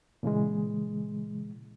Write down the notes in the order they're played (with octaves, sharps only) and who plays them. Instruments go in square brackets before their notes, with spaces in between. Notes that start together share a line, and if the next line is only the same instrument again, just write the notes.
[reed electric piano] A#2 C#3 E3 G#3